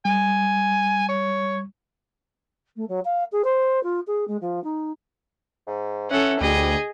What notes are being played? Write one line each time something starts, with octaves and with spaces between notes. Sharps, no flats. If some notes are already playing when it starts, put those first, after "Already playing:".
G3 G#5
C#5
A3
F#3
F5
G#4
C5
F4
G#4
G#3
F3
D#4
G#2
E3 C#4 A4 F#5
D2 G3 G#4 D#5